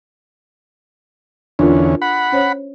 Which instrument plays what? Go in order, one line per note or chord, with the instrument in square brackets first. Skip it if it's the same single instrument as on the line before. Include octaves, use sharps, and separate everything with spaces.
[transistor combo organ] E2 D3 C#4 [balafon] D4 F4 A#4
[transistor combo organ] F#5 B5
[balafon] C#4 C5 C#5